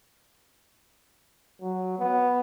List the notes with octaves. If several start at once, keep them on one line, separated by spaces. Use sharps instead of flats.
F#3
B3